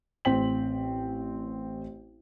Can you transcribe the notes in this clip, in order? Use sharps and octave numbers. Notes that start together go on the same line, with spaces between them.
A1 C4 C5 G5 B6 F#7